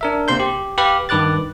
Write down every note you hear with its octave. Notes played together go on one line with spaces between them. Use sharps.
D4 A#4 E5
C3 A#3 C5 C6 G6
G4
G4 B4 F5
G2 D#3 B4 D6 F#6 A6